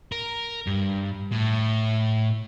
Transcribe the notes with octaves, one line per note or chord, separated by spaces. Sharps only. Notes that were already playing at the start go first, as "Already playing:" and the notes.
A#4
G2
A2